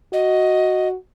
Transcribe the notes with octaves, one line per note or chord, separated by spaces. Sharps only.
F#4 D#5